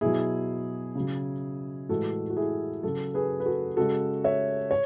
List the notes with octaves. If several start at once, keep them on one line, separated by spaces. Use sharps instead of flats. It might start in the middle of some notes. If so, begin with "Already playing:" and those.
B2 F#3 E4 G#4
C#3 F#3
A2 E3 G#3 F#4 A4
F#4
E4 G#4
C#3 F#3 F#4 A4
G#4 B4
B4
F#4 A4
C#3 G#3 F#4 A4
C#5 E5
C#5